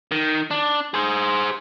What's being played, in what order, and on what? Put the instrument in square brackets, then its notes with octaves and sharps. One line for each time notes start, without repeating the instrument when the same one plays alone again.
[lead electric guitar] D#3
D4
G#4 C5